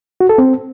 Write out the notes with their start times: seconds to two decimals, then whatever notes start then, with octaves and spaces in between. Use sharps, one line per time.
0.20 F#4
0.29 A4
0.38 C4